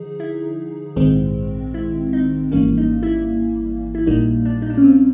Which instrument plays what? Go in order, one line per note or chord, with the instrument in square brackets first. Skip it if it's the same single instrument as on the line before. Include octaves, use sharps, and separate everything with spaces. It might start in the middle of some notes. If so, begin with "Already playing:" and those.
Already playing: [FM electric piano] D3 F3 D#4 G#4
[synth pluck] E4
[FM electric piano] A#1 G#2 D#3 G#3 C4
[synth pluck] E4
D#4
[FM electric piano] G#1 G#2 E3 G3 A#3 [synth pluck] C#4
[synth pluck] D#4
E4
E4
[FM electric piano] A#1 A#2 G3 A#3 [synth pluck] D#4
[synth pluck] D4
D#4
D4
C#4
C4